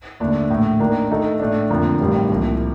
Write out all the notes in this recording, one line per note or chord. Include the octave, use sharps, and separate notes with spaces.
D#2 D3 A3 D4
A#1 A2 A3
D#3 A#3 D4
D#3 A3 D#4 A4
A2 A3 D4
F2 D3 F3 A#3
A1 G2 D#3 G3 C4
C2 A#2 F3